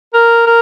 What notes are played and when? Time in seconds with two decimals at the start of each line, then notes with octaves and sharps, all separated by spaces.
0.14 A#4
0.47 A#4